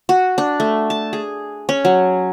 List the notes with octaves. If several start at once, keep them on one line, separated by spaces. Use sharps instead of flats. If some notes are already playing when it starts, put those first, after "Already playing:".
F#4
D4
A3
A5
G#4
C#4
F#3